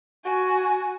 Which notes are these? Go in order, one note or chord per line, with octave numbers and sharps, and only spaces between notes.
F#4 G#5